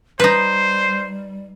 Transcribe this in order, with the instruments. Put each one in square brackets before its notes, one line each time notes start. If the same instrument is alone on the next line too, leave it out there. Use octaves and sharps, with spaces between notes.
[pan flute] G3 [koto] D#4 B4 [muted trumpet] C5